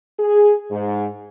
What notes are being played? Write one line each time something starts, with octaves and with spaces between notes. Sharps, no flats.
G#4
G#2